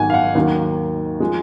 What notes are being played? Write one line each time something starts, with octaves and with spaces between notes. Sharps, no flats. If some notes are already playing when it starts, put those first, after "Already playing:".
Already playing: G#1 G#2 D#3 F#3 F#5 G#5
F5
F#5
D#2 D#3 F#3
F3 G#3